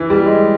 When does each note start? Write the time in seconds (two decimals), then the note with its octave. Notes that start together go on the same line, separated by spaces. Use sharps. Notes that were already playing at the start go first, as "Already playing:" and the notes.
Already playing: E3
0.10 G3
0.25 G#3